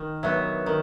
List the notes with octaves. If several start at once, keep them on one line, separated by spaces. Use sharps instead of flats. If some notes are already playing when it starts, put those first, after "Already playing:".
Already playing: D#3
F#3 B3 E5
D#3